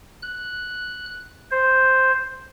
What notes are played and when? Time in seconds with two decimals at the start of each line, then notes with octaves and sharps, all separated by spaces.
0.22 F#6
1.51 C5